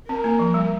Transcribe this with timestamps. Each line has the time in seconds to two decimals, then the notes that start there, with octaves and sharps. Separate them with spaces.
0.09 C4 A#4
0.24 A#3
0.39 F3
0.54 G3